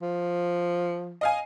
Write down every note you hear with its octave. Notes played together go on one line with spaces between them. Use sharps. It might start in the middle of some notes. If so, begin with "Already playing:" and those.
F3
D#5 F5 G#5